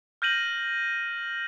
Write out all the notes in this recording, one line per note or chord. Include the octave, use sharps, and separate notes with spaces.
F6 G6 A#6 D#7 F#7